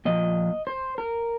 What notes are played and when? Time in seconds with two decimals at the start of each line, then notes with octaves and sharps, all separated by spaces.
0.05 A#2 F3 D#5
0.67 C5
0.98 A#4